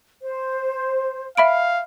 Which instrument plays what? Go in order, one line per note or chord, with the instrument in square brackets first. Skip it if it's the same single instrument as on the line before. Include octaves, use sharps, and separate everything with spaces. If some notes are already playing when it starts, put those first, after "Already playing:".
[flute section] C5
[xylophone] E5 B5 D7 [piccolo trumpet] F5